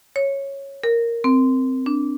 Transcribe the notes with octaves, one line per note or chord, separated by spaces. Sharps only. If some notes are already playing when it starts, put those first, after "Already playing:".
C#5
A#4
C4
D4